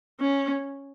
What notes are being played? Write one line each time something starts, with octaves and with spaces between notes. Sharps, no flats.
C#4